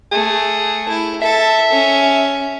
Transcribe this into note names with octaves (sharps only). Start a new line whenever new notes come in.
A3 G#4
E4
A4 E5
C#4